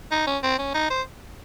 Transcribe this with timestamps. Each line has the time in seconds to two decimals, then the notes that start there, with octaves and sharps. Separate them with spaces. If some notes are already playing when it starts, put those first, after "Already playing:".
0.11 D#4
0.27 C#4
0.43 C4
0.58 C#4
0.74 D#4
0.90 C5